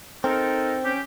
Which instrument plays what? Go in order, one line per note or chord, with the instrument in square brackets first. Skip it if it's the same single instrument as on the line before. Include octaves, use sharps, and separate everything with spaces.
[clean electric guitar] C4 [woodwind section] D#4 A4 A#4
[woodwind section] C#4 G4